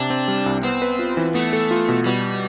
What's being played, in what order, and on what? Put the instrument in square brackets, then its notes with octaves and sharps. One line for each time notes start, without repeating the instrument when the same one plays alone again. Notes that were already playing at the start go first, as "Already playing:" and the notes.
Already playing: [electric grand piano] C3 [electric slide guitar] D4
[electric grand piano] C4
G3
C2
[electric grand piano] B3 [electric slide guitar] C4
[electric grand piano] B4
F4
E3
[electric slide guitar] A3 [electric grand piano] B3
[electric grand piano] A4
F4
B2
[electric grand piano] B2 [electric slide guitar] G3